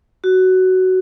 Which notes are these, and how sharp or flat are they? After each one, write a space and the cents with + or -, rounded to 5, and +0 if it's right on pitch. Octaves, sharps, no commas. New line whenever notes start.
F#4 +10